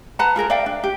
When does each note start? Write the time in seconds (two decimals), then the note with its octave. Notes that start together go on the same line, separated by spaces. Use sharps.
0.19 B4 F#5 A5 A#5
0.36 F4 G#4 A#4 A#5
0.50 D5 E5 F5 G5
0.66 D4
0.84 G4